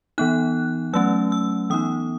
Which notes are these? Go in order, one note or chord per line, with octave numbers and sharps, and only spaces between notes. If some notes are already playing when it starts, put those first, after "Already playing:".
E3 B3 D#4 F#6
F#3 A3 C#4 E6
E6
E3 B3 D#4 D#6